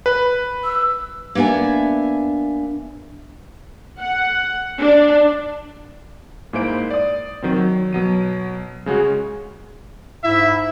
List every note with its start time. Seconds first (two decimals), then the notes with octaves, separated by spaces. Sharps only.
0.06 B4
0.64 E6
1.35 A#3 B3 D4 E5 G#5
3.99 F#5
4.78 D4
6.53 G#2 G#3 A#3 E4 C5 D7
6.91 D5 D#6
7.43 D#3 F#3 C4
7.56 F#3
7.93 B2 F#3 D#7
8.86 C#3 G#3 F#4 G#4
10.24 G#2 E4 E5